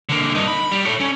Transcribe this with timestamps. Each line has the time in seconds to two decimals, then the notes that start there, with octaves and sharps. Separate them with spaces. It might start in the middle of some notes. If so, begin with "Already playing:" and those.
0.09 D3 A#3
0.35 G2 D#4
0.48 B5
0.71 G3
0.86 A4 C#5
1.00 C#4